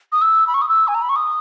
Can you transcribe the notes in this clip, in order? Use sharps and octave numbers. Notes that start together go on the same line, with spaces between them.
D#6
E6
B5
C#6
D#6
E6
G#5
A#5
B5
C#6
D#6